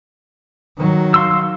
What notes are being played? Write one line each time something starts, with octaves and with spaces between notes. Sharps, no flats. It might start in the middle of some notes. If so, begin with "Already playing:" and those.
D#3 F#3
F5 C6 E6